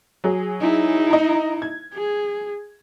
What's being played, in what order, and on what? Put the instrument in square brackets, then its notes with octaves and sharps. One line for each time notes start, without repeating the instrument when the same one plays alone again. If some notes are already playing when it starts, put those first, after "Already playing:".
[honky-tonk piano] F#3 G#4
[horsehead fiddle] D#4 E4
[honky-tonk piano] D#5 A#5
G#6
[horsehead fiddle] G#4